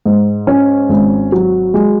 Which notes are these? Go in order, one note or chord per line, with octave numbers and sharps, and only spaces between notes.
G#2
C#4
G#1
F#3
G#3